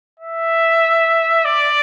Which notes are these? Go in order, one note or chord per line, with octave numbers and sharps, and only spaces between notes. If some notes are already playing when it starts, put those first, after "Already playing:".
E5
D5